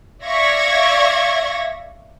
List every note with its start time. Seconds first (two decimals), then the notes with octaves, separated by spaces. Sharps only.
0.25 D5 E5 F5 C#6 G#6 A#6